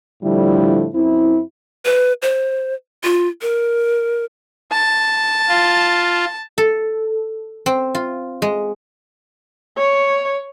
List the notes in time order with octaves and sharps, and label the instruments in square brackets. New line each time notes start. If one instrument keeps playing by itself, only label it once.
[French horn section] A2 D3 F3 G3 E4
F#2 C4 E4
[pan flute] B4
C5
F4
A#4
[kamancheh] A5
[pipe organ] F4
[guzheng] A4
C4
F4
G#3
[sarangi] C#5